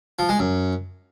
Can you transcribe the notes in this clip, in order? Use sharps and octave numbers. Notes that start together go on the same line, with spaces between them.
F3
G#3
F#2